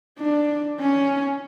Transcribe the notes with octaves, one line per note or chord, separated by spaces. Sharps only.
D4
C#4